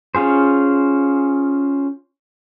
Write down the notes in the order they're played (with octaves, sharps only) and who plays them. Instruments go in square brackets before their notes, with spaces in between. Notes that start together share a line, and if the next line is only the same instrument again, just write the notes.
[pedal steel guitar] C#4 F4 G#4 C5